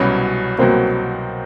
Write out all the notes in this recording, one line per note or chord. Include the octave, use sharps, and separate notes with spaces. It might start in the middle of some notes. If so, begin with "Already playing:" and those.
Already playing: C2 B2 F#3 B3 C#4
C2 B2 F#3 A#3 C4